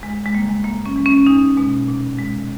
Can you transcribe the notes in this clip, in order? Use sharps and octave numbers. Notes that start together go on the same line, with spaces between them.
E2 G#3
G#3
C#3 G3 A#3
G#3
G2 A#3
C#4
E3 G#3
C#4
E2 D#4
B2 G#3
A#2
G#3